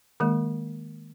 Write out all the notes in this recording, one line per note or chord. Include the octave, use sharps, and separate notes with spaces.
D#3 G#3 A#3